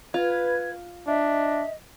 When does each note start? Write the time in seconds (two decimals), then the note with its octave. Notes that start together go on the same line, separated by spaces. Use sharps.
0.14 F4 B4 G#6
1.07 D4 D#5 E5